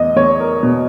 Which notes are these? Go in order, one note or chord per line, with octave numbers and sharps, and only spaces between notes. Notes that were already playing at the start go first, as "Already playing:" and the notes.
Already playing: E2 D#5
E2 C#5
A#4
B2